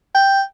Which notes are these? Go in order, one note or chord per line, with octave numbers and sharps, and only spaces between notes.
G5